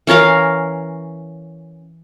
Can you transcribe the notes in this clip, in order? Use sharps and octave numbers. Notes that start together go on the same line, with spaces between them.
E3 C#4 A#4 F5